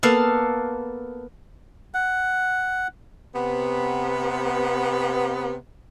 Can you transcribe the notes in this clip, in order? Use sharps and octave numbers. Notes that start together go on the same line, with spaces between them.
A#3 B3 A4 F5
F#5
C3 B3